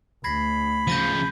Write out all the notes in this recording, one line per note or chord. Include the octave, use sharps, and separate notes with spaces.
D2 B5 G#6 A#6 C7
C#3 F3 G6 A#6 D#7